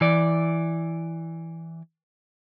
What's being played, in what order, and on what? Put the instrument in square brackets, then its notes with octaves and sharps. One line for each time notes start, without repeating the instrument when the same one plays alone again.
[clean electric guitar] E3 D5